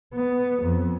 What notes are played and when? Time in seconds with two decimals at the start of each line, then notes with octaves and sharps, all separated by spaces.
0.15 B3
0.63 F2